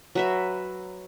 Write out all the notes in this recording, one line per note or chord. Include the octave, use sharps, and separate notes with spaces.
F#3 B4 E5